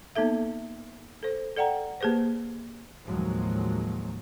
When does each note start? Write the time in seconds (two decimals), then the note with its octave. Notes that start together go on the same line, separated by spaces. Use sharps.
0.16 A#3 B3 D#4 A4 E5
1.23 A4 C5
1.57 A4 D5 F#5 G5 A#5
2.01 A#3 G4 G#4 B4 C5
3.05 D#2 A2 F3 F#3 G#3